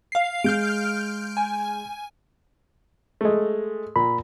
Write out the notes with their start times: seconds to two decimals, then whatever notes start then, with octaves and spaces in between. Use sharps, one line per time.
0.12 F5 C7
0.44 G#3 F6 G6 D7
1.37 G#5
3.21 G#3 A3
3.96 A#2 B5